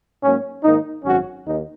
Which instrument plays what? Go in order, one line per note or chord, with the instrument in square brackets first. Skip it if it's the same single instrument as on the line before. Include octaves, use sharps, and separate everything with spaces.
[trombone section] G#2 F#3 A#3 C#4
G#2 D#3 A#3 D#4
G#1 F#2 F#3 C#4 F#4
D#2 D#4